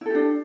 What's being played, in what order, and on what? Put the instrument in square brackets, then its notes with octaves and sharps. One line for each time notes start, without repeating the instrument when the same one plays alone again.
[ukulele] E4
A4
G4
D4